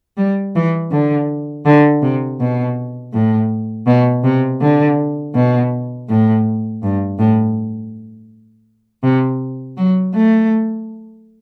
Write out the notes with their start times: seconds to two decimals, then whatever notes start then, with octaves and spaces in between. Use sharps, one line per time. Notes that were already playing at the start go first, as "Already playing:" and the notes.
0.17 G3
0.55 E3
0.91 D3
1.65 D3
2.02 C3
2.40 B2
3.13 A2
3.87 B2
4.24 C3
4.61 D3
5.35 B2
6.09 A2
6.83 G2
7.19 A2
9.03 C3
9.77 F#3
10.14 A3